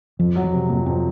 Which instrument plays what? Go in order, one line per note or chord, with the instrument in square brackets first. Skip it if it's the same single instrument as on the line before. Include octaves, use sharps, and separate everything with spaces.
[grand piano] F2 [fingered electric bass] F3
[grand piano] F#3
[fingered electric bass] F3
[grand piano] C3
[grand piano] F2 [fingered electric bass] A#3
[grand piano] F2 [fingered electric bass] C4